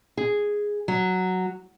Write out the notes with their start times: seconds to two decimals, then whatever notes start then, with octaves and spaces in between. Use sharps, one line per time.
0.17 G#4
0.88 F#3